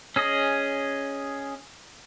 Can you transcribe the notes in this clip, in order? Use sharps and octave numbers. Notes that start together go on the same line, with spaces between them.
C#4 G#4 D#5